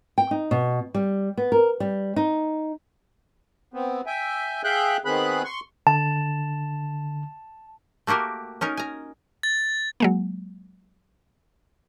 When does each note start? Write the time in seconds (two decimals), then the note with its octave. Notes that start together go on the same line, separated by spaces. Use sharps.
0.18 G5
0.31 D#4
0.51 B2
0.94 G3
1.37 B3
1.52 A#4
1.80 G3
2.16 D#4
3.74 B3 C4
4.06 E5 G5 G#5
4.64 G#4 E5 F5 G5 F#6 G6
5.05 D#3 B3 C4 G#4 B5 F#6
5.45 C6 C#6
5.87 D3 A5
8.07 A3 A#3 F#4 G4 A#4
8.61 C#4 D#4 A#4
8.77 G#5 A#5
9.43 A6
10.00 F#3 G#3 A#3